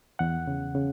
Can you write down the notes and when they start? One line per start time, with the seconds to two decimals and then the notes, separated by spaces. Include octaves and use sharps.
0.19 E2 F#5
0.47 C#3
0.75 C#3